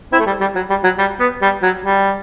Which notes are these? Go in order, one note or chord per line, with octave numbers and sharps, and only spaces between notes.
C4 E4
A3
G3
G3
F#3
G3
F#3
G3
B3
G3
F#3
G3